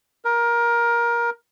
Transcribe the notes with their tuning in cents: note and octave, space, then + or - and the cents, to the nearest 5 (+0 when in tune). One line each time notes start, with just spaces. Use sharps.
A#4 +20